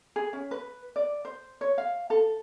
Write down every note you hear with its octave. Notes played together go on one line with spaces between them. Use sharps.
G#4
C#4
B4
D5
C5
C#5
F5
A4